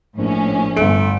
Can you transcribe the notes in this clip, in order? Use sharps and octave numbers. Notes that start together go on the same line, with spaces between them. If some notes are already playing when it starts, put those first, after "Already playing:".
A#1 A2 C#4
G1 A3 D7